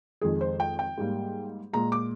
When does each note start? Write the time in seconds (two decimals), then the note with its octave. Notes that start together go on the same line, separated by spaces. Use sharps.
0.21 F2 D#3 G#3 G#4
0.41 C5
0.60 G5
0.79 G5
0.98 G#2 G3 A#3
1.73 A#2 G#3 A#5
1.92 D6